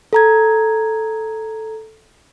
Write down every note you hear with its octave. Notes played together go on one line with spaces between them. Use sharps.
A4 A#5 G#6